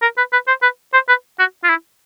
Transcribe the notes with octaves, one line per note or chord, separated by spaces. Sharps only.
A#4
B4
B4
C5
B4
C5
B4
F#4
F4
E4